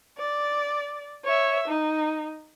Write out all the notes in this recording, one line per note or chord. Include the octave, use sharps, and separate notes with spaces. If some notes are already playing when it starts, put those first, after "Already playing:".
D5
C#5 E5
D#4